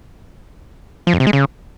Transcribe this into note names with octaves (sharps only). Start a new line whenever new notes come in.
F3
F2
C3
G#3
C#3